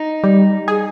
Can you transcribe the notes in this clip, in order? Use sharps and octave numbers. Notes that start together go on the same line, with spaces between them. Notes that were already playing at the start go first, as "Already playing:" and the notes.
Already playing: D#4
G3
G#4